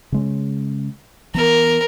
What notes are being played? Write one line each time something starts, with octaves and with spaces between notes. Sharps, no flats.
C#3 G#3 C#4
E3 B3 A#4